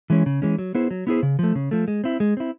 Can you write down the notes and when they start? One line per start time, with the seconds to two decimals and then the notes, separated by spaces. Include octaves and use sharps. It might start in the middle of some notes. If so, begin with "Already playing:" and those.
0.10 E3 G#3 C#4
0.26 C#3
0.42 E3 G#3 C#4
0.59 F#3
0.75 B3 E4 G#4 C5
0.91 F#3
1.07 B3 E4 G#4 C5
1.23 C#3
1.39 F3 A3
1.55 C#3
1.71 F3 A3
1.88 G#3
2.04 C4 E4
2.20 G#3
2.37 C4 E4